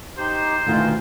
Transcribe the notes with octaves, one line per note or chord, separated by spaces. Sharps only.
D#4 G4 C5
D2 B2 D#3 F4